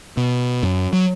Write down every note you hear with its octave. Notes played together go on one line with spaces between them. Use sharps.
B2
F#2
F#3